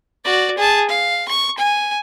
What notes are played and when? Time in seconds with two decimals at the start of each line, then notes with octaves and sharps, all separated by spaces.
0.25 F#4 D5
0.58 G#4 A5
0.89 F5
1.29 C#6
1.58 G#5